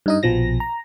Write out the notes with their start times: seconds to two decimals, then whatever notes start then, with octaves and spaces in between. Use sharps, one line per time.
0.06 G2 D#4 D#5
0.23 A#1 B2 F3 A#6
0.60 A#5